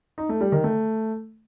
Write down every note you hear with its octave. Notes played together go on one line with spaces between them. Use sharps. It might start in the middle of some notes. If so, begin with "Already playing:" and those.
D#4
A3
G3
D#3
A3